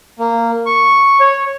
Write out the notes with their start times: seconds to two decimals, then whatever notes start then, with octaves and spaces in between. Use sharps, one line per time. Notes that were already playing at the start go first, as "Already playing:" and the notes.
0.19 A#3
0.66 C#6
1.20 C#5